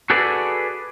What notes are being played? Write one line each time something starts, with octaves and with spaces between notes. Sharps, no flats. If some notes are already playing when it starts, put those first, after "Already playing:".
F#4 G#4 A4 B4 D5